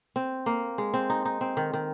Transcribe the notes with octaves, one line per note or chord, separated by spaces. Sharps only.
C4
A#3
G#3
C4
D#4
D#4
C4
D#3
D#3